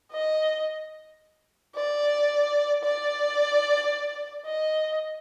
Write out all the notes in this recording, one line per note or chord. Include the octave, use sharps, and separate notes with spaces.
D#5
D5
D5
D#5